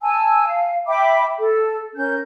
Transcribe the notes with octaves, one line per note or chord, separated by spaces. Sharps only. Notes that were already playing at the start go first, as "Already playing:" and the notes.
G#5 A5 E6
F5
E5 G5 B5 D6
A4
C#4 A#4 G6